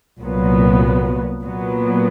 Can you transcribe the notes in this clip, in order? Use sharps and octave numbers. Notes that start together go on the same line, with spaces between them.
C2 A#2 F#3 B3
A#2 F#3 B3